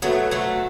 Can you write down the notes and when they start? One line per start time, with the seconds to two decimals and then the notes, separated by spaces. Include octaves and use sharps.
0.02 F#3 A3 B3 F#4 B4 E5
0.31 F#3 A3